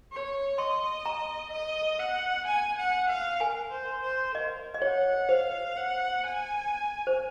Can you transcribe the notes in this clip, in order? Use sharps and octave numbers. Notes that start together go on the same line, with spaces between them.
C#5
D#5 C6
A#5
D#5
F#5
G#5
F#5
F5
A#4 G#5
C5
C5
A#4 D#5
D#5
C#5 F#5
C5 F5
F#5
G#5
C5